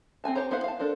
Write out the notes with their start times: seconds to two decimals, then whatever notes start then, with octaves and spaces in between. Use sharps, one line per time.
0.24 C4 D#4 G#5 A5
0.35 G4 C5 C#5 A#5
0.51 B3 E4 C5 F5 F#5
0.64 F5 A5
0.79 D4 A4 A#4 C5